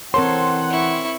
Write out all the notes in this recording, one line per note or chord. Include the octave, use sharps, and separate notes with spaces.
E3 C4 A4 A#4 C#5 F#5 C6
E4 C#6